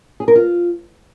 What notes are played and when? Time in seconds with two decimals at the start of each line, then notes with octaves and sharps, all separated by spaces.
0.20 G#4
0.28 A#4
0.35 F4